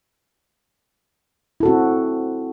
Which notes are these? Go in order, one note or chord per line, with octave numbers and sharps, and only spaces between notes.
C4 E4 F#4 A4